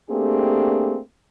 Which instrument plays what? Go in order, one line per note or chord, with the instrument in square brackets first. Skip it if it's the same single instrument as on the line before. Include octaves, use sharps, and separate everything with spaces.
[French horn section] A3 A#3 C4 D4 G4 G#4